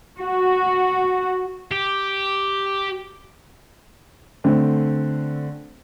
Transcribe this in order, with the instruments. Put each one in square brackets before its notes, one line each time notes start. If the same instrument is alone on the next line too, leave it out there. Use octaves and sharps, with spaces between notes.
[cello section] F#4
[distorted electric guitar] G4
[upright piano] D3 A3 C4